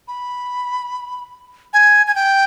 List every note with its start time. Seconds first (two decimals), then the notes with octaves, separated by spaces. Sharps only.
0.08 B5
1.73 G#5
2.07 G#5
2.15 G5